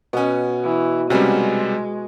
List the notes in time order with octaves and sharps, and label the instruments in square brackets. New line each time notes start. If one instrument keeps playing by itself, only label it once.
[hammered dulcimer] B2 [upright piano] B3 C#4
[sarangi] E3
[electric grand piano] C3 G3 [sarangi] G#3 [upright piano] B3 C#4 F#4